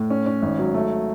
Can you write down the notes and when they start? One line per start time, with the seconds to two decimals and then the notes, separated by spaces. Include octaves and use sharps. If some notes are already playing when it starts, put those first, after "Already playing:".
Already playing: A2
0.10 C#4
0.26 C#4
0.42 G#1
0.59 F#3
0.74 A3